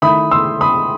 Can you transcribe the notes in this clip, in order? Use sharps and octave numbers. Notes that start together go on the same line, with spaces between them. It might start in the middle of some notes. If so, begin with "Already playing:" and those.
D#3 A3 E4 B5 D#6
C6 E6
B5 D#6